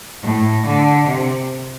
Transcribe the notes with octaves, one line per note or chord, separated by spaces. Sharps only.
A2
D3
C3